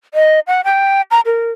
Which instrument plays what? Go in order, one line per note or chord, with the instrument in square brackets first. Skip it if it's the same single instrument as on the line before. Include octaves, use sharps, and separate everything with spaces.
[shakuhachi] D#5
F#5
G5
A#5
A#4